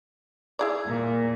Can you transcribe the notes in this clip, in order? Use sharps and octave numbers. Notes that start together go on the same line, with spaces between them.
E4 G#4 D5
A#2